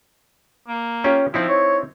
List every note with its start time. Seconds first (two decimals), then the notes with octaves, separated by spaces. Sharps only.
0.68 A#3
1.04 C#4 F4 G4
1.34 F3 C4 D#4 E4
1.49 C#5